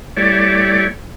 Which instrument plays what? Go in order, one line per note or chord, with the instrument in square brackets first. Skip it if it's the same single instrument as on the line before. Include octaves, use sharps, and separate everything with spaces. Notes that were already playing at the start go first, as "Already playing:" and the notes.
[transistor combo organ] G3 A3 E4 C#5 D5